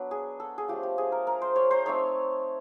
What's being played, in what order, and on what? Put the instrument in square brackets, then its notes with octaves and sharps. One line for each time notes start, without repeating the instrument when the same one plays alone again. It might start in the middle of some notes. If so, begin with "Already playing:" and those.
Already playing: [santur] F#3 B3 D4
G#4
A4
G#4
F3 A3 D4 G4
G4
G#4
A#4
A#4
C5
C#5
C5
A3 C4 D#4 C#5